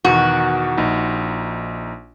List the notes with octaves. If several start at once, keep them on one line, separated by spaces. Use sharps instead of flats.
E2 B2 D#3 F#4
A#1 D#4